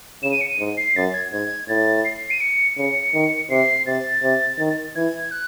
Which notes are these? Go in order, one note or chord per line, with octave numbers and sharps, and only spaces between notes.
C#3 E7
D#7
C#7
D#7
G#2
C7
F#2 A6
G#6
G#2 G#6
A2 A6
C7
D#7
C#7
C#3 C#7
D#3
C3 C7
C3 A6
C3
D#3
E3 G#6
F#6